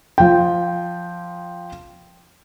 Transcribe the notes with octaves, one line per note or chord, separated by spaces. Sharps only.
F3 G5